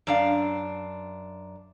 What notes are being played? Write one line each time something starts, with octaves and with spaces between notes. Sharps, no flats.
F#2 D4 F5